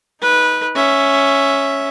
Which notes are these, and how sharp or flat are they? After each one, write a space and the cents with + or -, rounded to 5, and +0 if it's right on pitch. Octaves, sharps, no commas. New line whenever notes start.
D#4 +20 B4 -15
C#4 +0 E5 +0